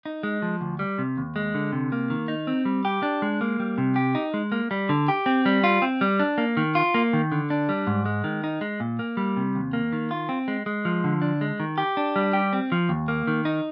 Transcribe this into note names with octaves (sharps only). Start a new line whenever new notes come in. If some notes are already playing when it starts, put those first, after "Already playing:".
D#4
G#3
F3
D2
G3
C3
D#2
G#3
D3
C3
A#3
D#3
D#4
C4
G3
G4
D4
G#3
A#3
G3
C3
G4
D#4
G#3
A#3
G3
D3
G4
C4
G3
F4
C4
G3
D4
A#3
D#3
F4
A#3
D#3
D3
D4
G3
G#2
G#3
D#3
D#4
G#3
A#2
A#3
G3
C3
D#2
A#3
D#3
F4
C4
G#3
G#3
F3
D3
D4
G#3
D#3
G4
D4
G3
G4
C4
F3
D#2
A#3
D#3
D#4